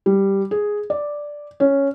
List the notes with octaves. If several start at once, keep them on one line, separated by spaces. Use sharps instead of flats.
G3
G#4
D5
C#4